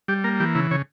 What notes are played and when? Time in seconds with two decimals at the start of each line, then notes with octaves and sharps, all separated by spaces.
0.08 G3 G4
0.24 A#3 A#4
0.40 E3 G4
0.55 C#3 E4
0.71 C#3 C#5